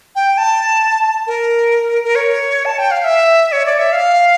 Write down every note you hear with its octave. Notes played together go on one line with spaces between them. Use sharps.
G5
A5
A#4
A#4
C#5
A5
G5
F5
E5
C#5
D5
E5
F5